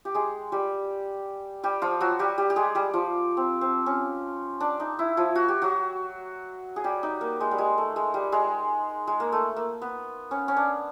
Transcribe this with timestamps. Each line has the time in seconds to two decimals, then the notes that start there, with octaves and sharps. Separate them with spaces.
0.05 G4
0.15 G#3 G#4
0.52 G3 G4
1.63 G3 G4
1.82 F3 F4
2.01 F#3 F#4
2.19 G3 G4
2.38 G3 G4
2.50 G4
2.56 G#3 G#4
2.75 G3 G4
2.94 F3 F4
3.37 C4
3.61 C4
3.86 C#4
4.60 D4
4.80 D#4
4.99 E4
5.17 F3 F4
5.35 F#4
5.48 G4
5.62 F#3 F#4
6.76 G#4
6.84 G3 G4
7.03 D#4
7.21 A#3
7.40 G#3
7.51 G3
7.58 G#3
7.78 A3
7.96 G#3
8.14 G3
8.32 G#3
9.07 G#3
9.20 A#3
9.32 A3
9.56 A#3
9.82 B3
10.31 C#4
10.48 C#4
10.57 D4